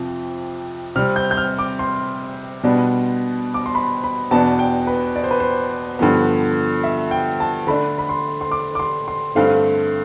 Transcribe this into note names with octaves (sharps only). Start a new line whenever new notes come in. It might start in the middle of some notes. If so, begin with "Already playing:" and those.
Already playing: F2 C3 F3 C4
C3 G3 C4 F6
G6
G6
F6
D6
C6
B2 G3 B3 D4
D6
C6
B5
B5
E2 B2 B3 D4 A5
G5
B4
D5
C5
B4
C5
G2 D3 F3 B3
E5
G5
A5
D3 A3 D4 B5
B5
C6
C6
D6
D6
C6
C6
G2 D3 A3 C4 F5